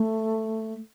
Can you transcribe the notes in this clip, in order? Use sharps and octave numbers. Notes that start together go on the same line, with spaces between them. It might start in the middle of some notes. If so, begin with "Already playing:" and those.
Already playing: A3